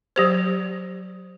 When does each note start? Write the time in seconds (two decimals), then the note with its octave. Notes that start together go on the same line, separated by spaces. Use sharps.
0.16 F#3 G4 C5